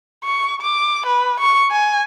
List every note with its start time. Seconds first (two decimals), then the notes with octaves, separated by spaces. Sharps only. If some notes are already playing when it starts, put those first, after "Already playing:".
0.25 C#6
0.61 D6
1.06 B4
1.40 C#6
1.71 G#5